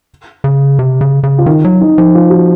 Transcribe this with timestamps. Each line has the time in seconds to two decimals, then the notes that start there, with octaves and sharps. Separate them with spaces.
0.44 C#3
0.79 C3
1.01 C#3
1.23 C#3
1.38 F4
1.46 D#3 D#4
1.64 F#3
1.81 D#4
1.98 F3 D#4
2.15 F4
2.30 F#4